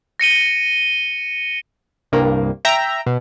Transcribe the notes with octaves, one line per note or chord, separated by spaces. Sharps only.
A#6 C#7 D#7 G7
C2 G2 A#3
E5 G5 A#5
B2